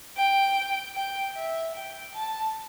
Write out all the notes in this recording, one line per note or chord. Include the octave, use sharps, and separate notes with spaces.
G5
G5
E5
G5
A5